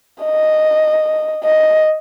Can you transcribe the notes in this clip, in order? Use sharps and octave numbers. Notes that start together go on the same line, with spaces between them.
D#5
D#5